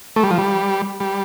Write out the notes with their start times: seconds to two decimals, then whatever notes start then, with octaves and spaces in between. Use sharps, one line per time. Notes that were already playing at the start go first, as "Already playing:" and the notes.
0.16 A3
0.23 G3
0.31 F3
0.38 G3
1.00 G3